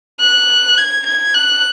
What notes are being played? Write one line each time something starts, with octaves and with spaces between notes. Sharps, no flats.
F#6
G#6
G#6
F#6